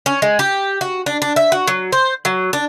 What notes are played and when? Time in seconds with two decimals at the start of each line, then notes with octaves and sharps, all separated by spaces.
0.06 C#4
0.22 G#3
0.39 G4
0.81 F#4
1.06 D4
1.22 D4
1.36 E5
1.52 F#4
1.67 F#3
1.92 C5
2.25 F#3
2.53 D4